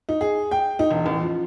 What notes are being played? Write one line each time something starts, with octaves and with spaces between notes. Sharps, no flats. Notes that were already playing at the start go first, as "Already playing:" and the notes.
D#4
G#4
G5
D#4
E1
A1
F3